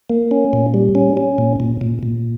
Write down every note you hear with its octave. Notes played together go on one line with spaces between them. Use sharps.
A#3
C#4
A#2
G3
C#4
C#4
A#2
A#2
A#2
A#2